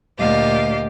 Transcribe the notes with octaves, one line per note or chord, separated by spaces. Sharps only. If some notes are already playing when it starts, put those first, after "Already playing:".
D2 A#2 G4 D#5 F5